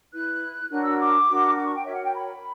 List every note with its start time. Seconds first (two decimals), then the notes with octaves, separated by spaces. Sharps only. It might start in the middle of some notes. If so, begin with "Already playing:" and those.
0.12 E4 B4 F#6
0.69 D4 F#4 A#4 C#5 F#6
0.84 E6
0.98 D6
1.27 D4 F#4 A#4
1.56 D6
1.65 C#6
1.75 G5
1.84 F#4 A#4 C#5 E5
1.94 F#5
2.04 G5
2.13 B5